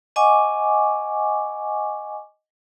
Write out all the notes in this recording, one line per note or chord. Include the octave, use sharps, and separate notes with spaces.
D#5 F#5 G#5 C#6 D6